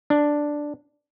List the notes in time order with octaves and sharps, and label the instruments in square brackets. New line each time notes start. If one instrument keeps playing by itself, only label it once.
[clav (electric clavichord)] D4